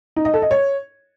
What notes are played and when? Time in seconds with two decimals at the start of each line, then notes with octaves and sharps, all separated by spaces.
0.16 D#4
0.25 D#5
0.34 A4
0.42 D#5
0.51 C#5